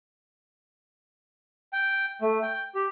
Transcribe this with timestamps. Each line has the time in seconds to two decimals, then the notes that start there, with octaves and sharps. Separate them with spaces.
1.73 G5
2.22 A3
2.42 G5
2.75 G4